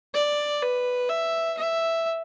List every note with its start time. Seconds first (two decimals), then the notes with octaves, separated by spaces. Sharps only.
0.14 D5
0.62 B4
1.09 E5
1.58 E5